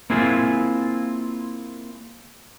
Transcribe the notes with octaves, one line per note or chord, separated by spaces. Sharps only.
A#3 C4 E4 F4 G#4